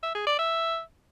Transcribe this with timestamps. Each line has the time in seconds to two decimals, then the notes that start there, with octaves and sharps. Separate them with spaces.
0.03 E5
0.15 G#4
0.27 D5
0.39 E5